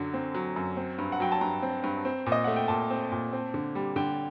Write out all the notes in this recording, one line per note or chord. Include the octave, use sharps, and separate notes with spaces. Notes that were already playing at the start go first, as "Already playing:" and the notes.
Already playing: F#2 D3 F#3
C4
F#3
F#2
C4
G2
F#5
F#3 G5
A5
G2 A#5
C4
G2
C4
A#2
D#5
A3 F#5
G5
A#2 A5
C4
A#2
C4
D3
G3
D3 G5